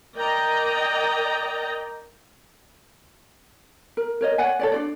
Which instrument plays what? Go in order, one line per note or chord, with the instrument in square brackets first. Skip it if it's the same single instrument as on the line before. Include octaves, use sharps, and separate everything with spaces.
[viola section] A#4 D5 D#5 G5 A#5
[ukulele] A#4
A#4 C#5 D#5
C#5 D5 F#5 G#5
A4 C#5 D5
D4 F#4 D5